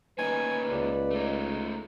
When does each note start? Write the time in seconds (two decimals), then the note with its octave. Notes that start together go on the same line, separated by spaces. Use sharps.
0.19 A#3 C#4 D#4 B4 G#5
0.69 C#2 D5
1.11 A3 D#4